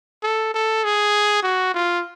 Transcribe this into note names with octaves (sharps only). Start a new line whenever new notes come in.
A4
A4
G#4
F#4
F4